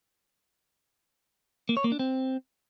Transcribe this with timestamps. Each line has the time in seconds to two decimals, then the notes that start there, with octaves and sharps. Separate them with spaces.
1.69 A#3
1.77 C#5
1.84 A#3
1.92 D4
1.99 C4